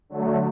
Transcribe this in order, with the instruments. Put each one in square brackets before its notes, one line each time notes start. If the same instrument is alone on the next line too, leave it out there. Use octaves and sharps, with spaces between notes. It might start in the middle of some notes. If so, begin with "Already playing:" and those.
[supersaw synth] D3 F#3 A3